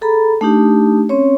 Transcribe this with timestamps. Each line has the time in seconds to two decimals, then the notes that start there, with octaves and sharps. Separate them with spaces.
0.01 G#4 A4 A#5 B5
0.41 A3 D4 D#4 G4
1.09 C4 C#4 C#5